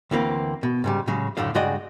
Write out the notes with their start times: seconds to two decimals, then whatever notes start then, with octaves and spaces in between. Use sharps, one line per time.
0.11 D2 E3 A#3 C4
0.63 B2
0.84 G#2 C#3 G3
1.07 A2 C#3 F#3 G#3
1.37 C#2 F#2 A2 D3 A3 F5
1.55 G2 C#3 G#3 F#4 D5 D#5